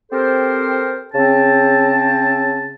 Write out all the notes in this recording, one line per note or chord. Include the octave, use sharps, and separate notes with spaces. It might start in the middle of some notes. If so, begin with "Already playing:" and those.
C4 G4 A4 A#4 C5
C#3 C4 A5